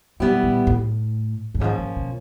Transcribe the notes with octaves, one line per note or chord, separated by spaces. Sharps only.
B2 G3 B3 E4 G4
A#2
A2
G2
G#2 F3 A#3 C#4
G#2
B2